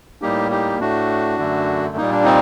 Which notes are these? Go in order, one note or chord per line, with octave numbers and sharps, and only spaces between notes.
A2 G3 A#3 D#4 G4
D#4 G4
A2 A3 D4 F#4
F#2 D3 A3
A#2 G3 A#3 D#4
D4
C4 D#4